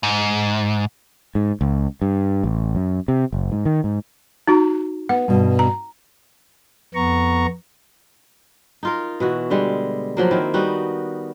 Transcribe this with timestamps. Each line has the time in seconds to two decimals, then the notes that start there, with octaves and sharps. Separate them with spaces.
0.03 G#2
1.35 G#2
1.61 C#2
2.02 G2
2.44 A1
2.75 F#2
3.08 C3
3.33 F#1
3.52 G#2
3.65 D#3
3.84 G#2
4.47 D#4 F#4 A#5
5.09 B3 F#5
5.28 G2 B2
5.59 A#5
6.94 F2 B3 A#5 C#6
8.83 D#4 F4 A#4
9.20 B2 E3 F#4
9.50 D3 G3 G#3
10.17 F3 F#3 A#3
10.31 D#3 C4 E4
10.54 G3 B3 D#4 F#4